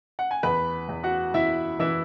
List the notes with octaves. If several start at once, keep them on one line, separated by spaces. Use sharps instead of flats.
F#5
G#5
E2 B4 B5
E2
F#4 F#5
E2 E4 E5
E3 E4 E5